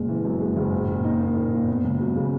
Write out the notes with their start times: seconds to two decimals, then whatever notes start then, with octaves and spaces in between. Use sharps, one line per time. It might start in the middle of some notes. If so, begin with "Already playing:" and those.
Already playing: F#1 A#2 G#3
0.08 E3
0.25 F#2
0.40 G#3
0.57 F#1
0.72 A#2
0.88 A#2
1.04 D#4
1.20 A#3
1.36 A#2
1.52 A#2
1.68 B3
1.84 C#2
2.00 F#3
2.16 C#3